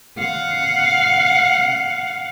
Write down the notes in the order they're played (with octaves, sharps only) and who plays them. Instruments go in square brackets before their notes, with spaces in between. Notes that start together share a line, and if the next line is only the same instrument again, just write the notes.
[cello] F5 F#5